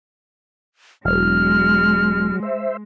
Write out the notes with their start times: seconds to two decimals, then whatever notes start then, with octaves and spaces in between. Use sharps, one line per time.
1.05 E1 F#3 G#3 F6
2.42 C5 E5